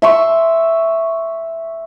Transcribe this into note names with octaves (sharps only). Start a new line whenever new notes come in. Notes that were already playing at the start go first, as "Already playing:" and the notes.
E5 C6 C#6